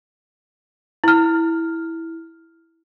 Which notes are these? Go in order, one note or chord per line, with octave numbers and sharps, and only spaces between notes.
E4 F6